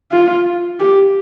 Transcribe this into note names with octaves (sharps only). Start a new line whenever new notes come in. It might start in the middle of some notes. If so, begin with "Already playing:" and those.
F4
G4